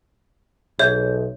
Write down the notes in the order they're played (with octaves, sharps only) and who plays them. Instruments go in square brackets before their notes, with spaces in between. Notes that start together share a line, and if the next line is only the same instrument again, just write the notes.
[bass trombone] B1 [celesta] G#4 E5 G6 [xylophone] C#5